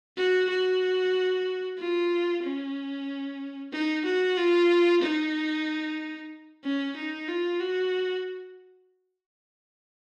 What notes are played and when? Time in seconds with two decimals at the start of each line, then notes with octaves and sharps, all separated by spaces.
0.17 F#4
0.49 F#4
1.78 F4
2.43 C#4
3.72 D#4
4.05 F#4
4.37 F4
5.02 D#4
6.63 C#4
6.96 D#4
7.28 F4
7.60 F#4